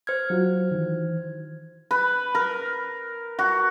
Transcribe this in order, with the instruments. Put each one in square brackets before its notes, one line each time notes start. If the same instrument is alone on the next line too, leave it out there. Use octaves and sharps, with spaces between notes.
[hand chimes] C5 F6 G#6
[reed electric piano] F#3 F4 F#4
D#3 E3
[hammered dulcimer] B4
A#4
F#4